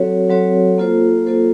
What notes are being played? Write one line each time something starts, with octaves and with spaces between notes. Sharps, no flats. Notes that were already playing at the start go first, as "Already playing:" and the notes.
Already playing: F#3 C4 F#4 A4 C#5
F#3 C4 F#4 A4 C#5
A#3 F4 A4 C5
A#3 F4 A4 C5